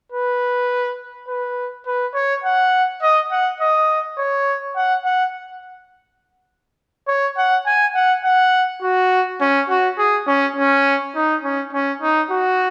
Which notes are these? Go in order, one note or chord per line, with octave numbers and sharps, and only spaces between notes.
B4
B4
B4
C#5
F#5
D#5
F#5
D#5
C#5
F#5
F#5
C#5
F#5
G#5
F#5
F#5
F#4
C#4
F#4
G#4
C#4
C#4
D#4
C#4
C#4
D#4
F#4